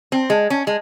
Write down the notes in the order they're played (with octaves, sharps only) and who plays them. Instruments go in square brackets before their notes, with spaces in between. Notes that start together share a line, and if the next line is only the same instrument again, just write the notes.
[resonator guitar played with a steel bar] C4
G#3
C#4
G#3